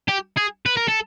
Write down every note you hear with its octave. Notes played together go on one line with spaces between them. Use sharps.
G4
G#4
B4
A#4
A4